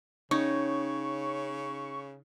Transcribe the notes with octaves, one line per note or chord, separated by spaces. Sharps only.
C#3 C#4 D#4 C#5 C#6 G#6